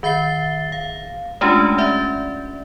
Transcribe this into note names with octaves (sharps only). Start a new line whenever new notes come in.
D#3 E5 A6 C7 G7
F5
G#3 A3 C#4 D4 F4 G4
C#4 D5 E5